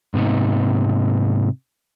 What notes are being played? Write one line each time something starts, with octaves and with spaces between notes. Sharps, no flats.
G#2 C3 B3 D#4